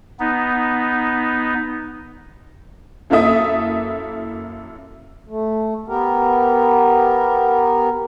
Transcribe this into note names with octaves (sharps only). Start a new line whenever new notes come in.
B3 D#4
F#2 A#3 E4 A4 E5 D#6
A3
B3 G4 A#4